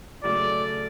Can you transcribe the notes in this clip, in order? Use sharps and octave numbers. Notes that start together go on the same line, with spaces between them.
C#3 F#3 A3 D5